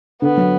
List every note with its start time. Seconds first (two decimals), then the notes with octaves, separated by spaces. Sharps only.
0.22 D3 B3
0.37 F#3